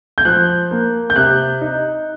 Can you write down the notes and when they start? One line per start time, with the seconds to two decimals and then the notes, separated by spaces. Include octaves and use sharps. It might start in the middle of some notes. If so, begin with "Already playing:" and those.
0.18 G6
0.25 F3 F#6
0.71 A#3
1.10 G6
1.16 C3 F#6
1.61 D#4